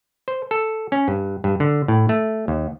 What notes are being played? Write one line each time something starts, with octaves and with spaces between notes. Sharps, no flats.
C5
A4
C#4
G2
G2
D3
A2
A3
D#2